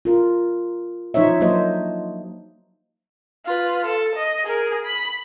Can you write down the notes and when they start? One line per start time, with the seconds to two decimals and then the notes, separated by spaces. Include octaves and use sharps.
0.05 F4 A#4
1.14 F3 D#4 C5 C#5 E5
1.40 F#3 A#3 D4 C5 D#5
3.45 F4 B4
3.86 A4
4.15 D#5
4.44 G#4 A#4
4.85 B5